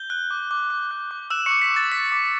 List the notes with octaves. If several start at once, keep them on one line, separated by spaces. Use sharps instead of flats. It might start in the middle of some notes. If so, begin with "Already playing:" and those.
Already playing: G6 G7
F#6
D6
D6
D6
F#6
D6
E6 F#6 E7
C#6 D6 C#7
B6
D6
A6
D6 B6
D6